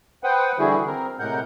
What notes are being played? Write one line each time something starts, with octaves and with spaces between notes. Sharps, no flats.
B4 C5 F#5 G5 D#6
D3 E3 G3 E4 F#4 G#4
C4 A#4
A2 C3 G#3 A#4 F#5 G6